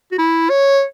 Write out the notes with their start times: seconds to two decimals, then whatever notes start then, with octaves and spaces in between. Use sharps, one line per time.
0.12 F#4
0.18 E4
0.50 C#5